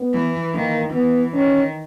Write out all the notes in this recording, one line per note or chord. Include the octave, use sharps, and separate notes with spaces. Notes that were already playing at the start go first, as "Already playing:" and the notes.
Already playing: B3
E3
D#3 A#3
E3 B3
D#3 C#4